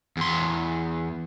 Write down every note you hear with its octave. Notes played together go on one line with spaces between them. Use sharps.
E2 C6